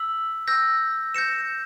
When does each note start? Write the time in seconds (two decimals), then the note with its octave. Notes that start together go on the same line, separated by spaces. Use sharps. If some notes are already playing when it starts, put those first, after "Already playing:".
Already playing: E6 B6 F#7
0.48 E6 G6 A#6
1.14 G6 A#6 C#7 E7